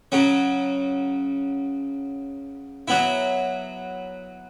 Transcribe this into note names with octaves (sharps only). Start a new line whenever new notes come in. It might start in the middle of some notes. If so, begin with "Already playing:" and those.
C#3 F#3 C#4
F#3 B3 E4